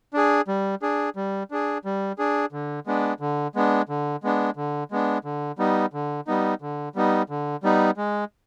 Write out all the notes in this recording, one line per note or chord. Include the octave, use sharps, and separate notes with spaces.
D4 G#4
G3
D4 G#4
G3
D4 G#4
G3
D4 G#4
D3
G#3 B3 D4
D3
G#3 B3 D4
D3
G#3 B3 D4
D3
G#3 B3 D4
D3
G3 B3 D#4
D3
G3 B3 D#4
D3
G3 B3 D#4
D3
G3 B3 D#4
G#3